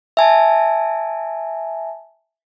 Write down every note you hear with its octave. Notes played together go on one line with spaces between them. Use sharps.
E5 G#5 A5